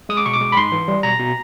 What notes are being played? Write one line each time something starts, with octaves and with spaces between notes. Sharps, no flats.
G#3 D#6
D6
B2 C#6
D6
G#3
B5
G#2 C6
E3
G3
B2 A#5
B2